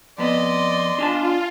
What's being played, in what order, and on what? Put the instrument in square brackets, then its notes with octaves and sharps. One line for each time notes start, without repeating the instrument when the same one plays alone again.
[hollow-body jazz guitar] F2 B3 [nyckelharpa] D5 D#5 [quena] C6
[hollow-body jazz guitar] D4 G#5 A5 [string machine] F4